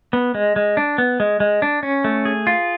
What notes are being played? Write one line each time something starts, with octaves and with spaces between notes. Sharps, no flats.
B3
G#3
G#3
D4
B3
G#3
G#3
D4
C#4
A3
G#4
F4